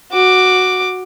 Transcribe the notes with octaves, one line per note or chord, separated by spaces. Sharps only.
F#4 D6